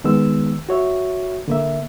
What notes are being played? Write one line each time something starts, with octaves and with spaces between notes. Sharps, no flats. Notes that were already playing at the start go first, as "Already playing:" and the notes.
D#3 G#3 B3 E6
F#4 C#5 E5
D3 A#3 E5